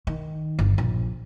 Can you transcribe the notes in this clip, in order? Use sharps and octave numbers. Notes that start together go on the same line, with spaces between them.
D#3
G1
A#1